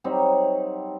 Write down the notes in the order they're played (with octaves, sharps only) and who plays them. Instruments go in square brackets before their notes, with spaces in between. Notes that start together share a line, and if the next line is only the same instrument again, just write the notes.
[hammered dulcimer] F#3 G3 C4 D#4